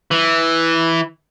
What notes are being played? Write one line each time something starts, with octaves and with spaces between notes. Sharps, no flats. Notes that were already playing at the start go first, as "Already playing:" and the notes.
E3